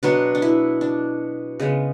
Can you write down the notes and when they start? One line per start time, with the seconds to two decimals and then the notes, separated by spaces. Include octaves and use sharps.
0.03 B2 F#3 B3 D4
0.35 D4
0.42 E4
0.81 D4
1.60 C#3 G#3 B3